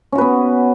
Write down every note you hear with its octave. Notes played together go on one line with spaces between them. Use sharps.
B3 C#4 F#4 B4